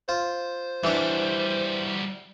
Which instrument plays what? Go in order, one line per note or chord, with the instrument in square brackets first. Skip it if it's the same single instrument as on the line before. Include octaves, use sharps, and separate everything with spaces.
[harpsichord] F4 [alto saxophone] C5
[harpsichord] E3 D4 [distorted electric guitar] G3 F#4